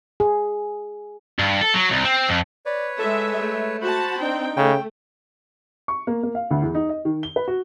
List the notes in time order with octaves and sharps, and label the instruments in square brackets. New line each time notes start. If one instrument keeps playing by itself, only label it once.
[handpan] G#4
[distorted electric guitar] G2
A4
F#3
C2
C4
F2
[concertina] B4 C#5 [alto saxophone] D5
[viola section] G#3 E5 [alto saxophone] A4
[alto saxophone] A3
[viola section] F#4 A5 [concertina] C5 B5
[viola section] C4 G5 [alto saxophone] D4 [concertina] D#4
[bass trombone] C#3 [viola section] A3 [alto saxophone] G5
[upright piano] C#6
A#3
A#3
F5
D2
E2
D#4
D#5
D#3
G7
B4
F#4